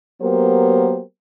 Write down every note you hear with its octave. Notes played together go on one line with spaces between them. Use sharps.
F#3 A#3 B3 G4 A#4 C5